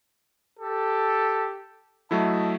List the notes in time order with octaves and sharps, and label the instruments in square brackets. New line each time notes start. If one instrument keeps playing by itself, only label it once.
[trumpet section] G4 A4
[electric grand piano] F#3 A3 E4 [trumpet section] D#5 E5 A5